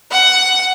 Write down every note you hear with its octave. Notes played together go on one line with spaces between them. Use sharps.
F#5